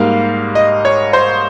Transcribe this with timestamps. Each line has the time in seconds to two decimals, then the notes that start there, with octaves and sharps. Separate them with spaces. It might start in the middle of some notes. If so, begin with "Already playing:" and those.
Already playing: G#2 G3 A#3 F5
0.55 D#5
0.85 C#5
1.13 C5